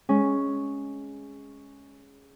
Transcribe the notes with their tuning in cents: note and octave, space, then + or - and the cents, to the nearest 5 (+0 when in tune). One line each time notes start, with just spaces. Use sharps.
G#3 +0 C#4 +0